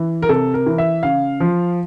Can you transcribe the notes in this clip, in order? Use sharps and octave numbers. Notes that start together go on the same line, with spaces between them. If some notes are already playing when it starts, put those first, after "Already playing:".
Already playing: E3
A#4
C3 A4
A#4
E3
E5
C#3 F5
F3